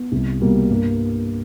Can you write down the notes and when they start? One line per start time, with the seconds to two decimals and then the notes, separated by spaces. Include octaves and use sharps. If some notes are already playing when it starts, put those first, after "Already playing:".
Already playing: B3
0.12 C2
0.41 B2 G3 A#3
0.70 G2 A#3